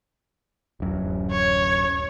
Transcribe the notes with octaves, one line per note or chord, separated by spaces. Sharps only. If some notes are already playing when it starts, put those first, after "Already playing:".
D1 F#2
C#5